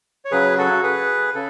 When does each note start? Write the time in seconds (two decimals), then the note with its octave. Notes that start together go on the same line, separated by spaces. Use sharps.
0.25 C#5
0.31 C#3 F#3 G#4 B4
0.58 F#4 A4
0.83 G#4 B4
1.35 C#3 A4